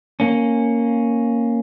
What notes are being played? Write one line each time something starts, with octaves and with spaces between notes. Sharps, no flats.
A#3 C#4